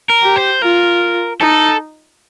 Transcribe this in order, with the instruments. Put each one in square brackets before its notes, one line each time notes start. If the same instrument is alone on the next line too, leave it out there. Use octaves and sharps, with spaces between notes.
[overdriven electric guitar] A#4
[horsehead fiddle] G4
[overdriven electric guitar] C5
[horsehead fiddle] F4 [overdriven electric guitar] A#4
[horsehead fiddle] D#4 [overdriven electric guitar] A4